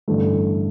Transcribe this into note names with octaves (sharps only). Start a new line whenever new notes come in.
A1 G2 D3 A3